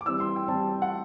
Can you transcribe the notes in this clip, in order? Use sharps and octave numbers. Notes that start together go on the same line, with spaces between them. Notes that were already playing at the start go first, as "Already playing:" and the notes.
D6
E3 G3 C4 E6
C6
G5
E3 G3 C4 A5
F#5